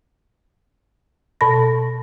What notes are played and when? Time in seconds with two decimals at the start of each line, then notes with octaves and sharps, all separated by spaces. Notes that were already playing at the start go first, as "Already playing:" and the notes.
1.41 B2 A5 B5 A#6